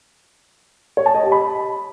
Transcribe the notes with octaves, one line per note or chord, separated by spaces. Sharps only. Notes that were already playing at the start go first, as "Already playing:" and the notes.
C#5
A5
D#5
G4
B5